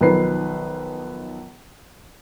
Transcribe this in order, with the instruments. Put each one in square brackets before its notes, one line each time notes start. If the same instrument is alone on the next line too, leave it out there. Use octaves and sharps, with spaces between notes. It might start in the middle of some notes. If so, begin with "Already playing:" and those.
[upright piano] B1 D#3 F3 B4 C5 C7